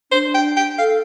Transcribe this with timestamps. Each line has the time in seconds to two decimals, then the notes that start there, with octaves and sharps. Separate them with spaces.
0.12 D4 C5
0.34 G5
0.56 G5
0.78 A4 F5